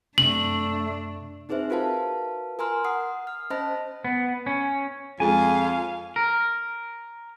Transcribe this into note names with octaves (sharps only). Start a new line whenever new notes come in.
F#2 C3 A3 D4 F#7
C4 D#4 G#4 B4 C5 E5
F4 F#4 A#4 B4 F5 A5
A#4 G#5 A#5 C6 F6
F#5 D#6 C7
F6
C#4 C5 D#5 A5 B5 A#6
B3
C#4
F2 G#3 F5 G#5
A#4